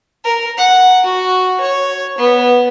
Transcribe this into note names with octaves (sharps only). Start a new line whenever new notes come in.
A#4
F#5
F#4
C#5
B3